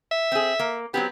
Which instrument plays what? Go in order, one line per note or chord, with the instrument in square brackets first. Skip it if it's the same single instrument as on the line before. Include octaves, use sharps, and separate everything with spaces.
[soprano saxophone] E5
[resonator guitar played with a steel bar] C4 G#4
A#3
[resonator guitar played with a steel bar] F#3 C4 G4 [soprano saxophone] B3